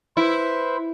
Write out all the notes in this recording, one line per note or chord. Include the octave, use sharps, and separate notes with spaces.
E4 B4 C5